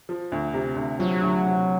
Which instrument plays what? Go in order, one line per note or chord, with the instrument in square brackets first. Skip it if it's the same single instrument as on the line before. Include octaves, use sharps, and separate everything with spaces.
[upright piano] F3
D2
C3
D2
[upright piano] F3 [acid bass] F#3
[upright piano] D2
C3